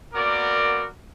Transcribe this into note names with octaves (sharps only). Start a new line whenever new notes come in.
A#3 B3 F#4 A#4 D5 D6